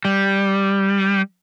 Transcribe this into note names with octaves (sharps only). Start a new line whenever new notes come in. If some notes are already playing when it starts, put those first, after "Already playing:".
G3